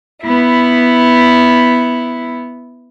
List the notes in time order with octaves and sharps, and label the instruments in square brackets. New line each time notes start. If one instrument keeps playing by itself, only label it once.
[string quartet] B3 E4